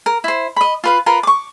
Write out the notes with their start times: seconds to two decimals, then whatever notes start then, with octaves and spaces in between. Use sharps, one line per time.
0.06 A#4
0.24 E4 C5
0.57 D#5 B5
0.84 F4 B4 F5
1.06 F4 A#4 B4 A#5
1.23 C#6 D6